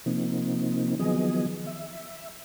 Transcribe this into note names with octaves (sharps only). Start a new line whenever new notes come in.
C3 F3 A#3 C4 D#4
D#3 F3 F#3 B3 G#4 D#5
E5